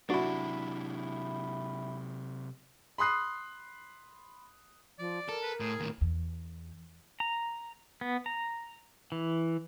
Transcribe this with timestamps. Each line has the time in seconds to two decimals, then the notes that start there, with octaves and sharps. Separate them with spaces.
0.10 C3 F#3 D4 E4 F#4
2.98 B5 C6 D#6 F#6 C7
4.99 F3 D5
5.29 A4 A#4
5.43 B4
5.60 A2 G#4
5.80 D#2 A2
6.01 E2
7.20 A#5
8.01 B3
8.26 A#5
9.12 E3